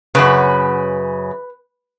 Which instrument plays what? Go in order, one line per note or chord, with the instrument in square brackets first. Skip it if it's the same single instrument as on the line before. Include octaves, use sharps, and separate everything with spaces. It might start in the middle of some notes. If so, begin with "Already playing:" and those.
[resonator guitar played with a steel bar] F#2 C#3 [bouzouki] B4